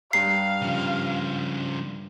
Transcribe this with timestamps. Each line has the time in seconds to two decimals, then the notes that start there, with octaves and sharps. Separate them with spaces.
0.13 G2 F5 A#5 C7
0.62 C#3 F3